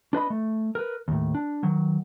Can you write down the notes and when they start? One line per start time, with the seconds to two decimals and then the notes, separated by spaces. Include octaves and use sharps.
0.13 D4 B4 D#5 B5
0.30 A3
0.75 A#4 B4
1.08 D#2 A2
1.35 D4
1.63 D#3 F#3